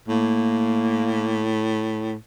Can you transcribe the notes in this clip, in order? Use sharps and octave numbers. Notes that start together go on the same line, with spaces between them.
A2 A#3